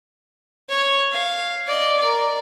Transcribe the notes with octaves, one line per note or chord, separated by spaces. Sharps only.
C#5
F5
D5 D#5
A#4 D5